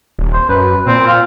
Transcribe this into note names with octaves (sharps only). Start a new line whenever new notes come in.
D#1
C5
F#2 B4
A#2 C4
F4